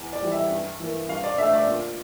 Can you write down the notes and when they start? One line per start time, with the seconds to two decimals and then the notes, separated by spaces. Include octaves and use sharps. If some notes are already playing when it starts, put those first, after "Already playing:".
Already playing: E2
0.13 D5
0.22 E3 G3
0.31 E5
0.51 G2
0.80 E3 A#3
1.09 G2 F5
1.24 D5
1.38 D3 A3 E5
1.53 D5
1.67 A#2